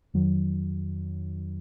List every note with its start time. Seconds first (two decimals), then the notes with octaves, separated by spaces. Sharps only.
0.14 F2 D#3 F#3